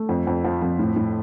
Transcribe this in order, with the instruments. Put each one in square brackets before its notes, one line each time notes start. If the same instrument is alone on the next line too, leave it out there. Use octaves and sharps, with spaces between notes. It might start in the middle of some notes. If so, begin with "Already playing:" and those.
Already playing: [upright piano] A3
F2
F2
F3
F2
A2
A2